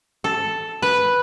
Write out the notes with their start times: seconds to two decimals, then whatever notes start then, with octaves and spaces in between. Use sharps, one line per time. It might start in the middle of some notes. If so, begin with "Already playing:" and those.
0.24 A4
0.82 B4